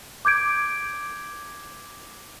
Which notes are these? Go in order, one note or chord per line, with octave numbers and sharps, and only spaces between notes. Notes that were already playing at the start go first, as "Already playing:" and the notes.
D6 G6 G#6 D7